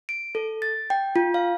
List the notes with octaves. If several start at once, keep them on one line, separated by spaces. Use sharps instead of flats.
D7
A4
A6
G5
F4
F5